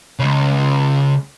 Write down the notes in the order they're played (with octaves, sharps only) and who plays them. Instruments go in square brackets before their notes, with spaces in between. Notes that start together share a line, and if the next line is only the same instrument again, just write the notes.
[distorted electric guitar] C#2 C#3